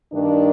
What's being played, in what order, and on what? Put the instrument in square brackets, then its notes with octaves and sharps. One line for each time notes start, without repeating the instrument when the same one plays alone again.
[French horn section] G2 D#3 A#3 D4